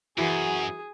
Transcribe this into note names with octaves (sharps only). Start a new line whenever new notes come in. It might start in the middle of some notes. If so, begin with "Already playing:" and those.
F#2 E3 F#4 G#4